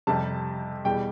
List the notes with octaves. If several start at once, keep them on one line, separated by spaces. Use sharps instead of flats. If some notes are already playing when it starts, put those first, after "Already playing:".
F2 C3 G3 A5
E2 B2 G3 G5